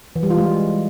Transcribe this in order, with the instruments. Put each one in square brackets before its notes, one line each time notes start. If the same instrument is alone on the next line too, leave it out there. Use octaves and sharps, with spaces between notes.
[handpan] E3
G3
F4
G#3